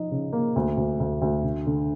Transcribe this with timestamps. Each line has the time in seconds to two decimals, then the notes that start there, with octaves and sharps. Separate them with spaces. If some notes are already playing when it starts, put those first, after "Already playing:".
Already playing: F3 D#4
0.11 C#3
0.33 A#3
0.56 D2
0.77 D2
1.00 D2
1.22 D2
1.43 D3
1.67 D3